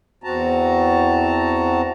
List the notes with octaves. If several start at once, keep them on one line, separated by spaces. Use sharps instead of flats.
E2 C4 F#4 A5 A#5